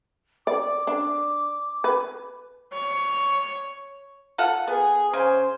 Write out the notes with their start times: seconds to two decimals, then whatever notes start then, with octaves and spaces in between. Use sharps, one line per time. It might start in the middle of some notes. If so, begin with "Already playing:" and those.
0.47 D5 D6
0.87 D4
1.84 B4
2.73 C#5
4.38 F4 A4 F#5
4.67 B3 G#4
5.13 C#3 C5 G#5